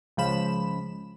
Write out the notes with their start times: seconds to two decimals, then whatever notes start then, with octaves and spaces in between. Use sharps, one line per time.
0.17 C#2 F3 B5 E7